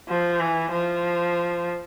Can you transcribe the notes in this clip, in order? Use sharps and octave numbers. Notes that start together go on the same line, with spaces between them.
F3
E3
F3